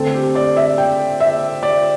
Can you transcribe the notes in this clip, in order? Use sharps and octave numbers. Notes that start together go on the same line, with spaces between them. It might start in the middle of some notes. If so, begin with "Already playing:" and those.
Already playing: D3 A3 C4 A4
G4
D5
E5
G5
E5
D5